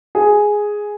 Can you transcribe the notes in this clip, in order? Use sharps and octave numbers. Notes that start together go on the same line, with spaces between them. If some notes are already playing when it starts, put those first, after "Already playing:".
G#4